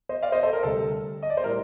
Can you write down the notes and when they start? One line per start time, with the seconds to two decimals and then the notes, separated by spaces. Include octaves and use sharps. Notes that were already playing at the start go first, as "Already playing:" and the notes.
0.09 C5 D#5
0.23 D5 F5
0.32 C5 D#5
0.43 A4 C5
0.53 A#4
0.63 D2 C3 G3 A4
1.23 D#5
1.30 D5
1.37 C5
1.44 A2 G3 A#4